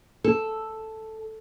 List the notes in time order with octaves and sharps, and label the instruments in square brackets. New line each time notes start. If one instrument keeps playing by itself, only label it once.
[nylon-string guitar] A4